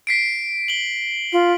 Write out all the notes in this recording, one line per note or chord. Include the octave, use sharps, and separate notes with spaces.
B6 C7 D7
F#7 G7
F4